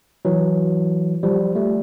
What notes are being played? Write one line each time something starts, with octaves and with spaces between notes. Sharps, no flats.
E3 F#3
F3 G3
G3 A3